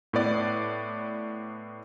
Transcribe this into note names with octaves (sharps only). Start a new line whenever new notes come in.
A2 B3 D5 D6